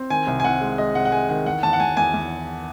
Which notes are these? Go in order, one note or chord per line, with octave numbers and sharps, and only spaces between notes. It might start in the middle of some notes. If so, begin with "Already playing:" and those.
Already playing: C4
D#3 G#5
C2
G#5
C2 F#5
G#3
G#3 D#5
C3 F#5
F#5
G#3 G#5
D#3 F#5
E2 F#5
E2 A5
F#5
E2 G#5
E2 G#5
E2